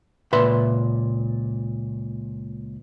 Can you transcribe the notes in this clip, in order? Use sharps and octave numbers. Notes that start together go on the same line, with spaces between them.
C#2 A#2 B4 E5 B5 C6